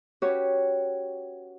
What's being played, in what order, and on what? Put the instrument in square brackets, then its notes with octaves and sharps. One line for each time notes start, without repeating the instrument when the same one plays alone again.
[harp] C#4 F#4 G4 B4 C#5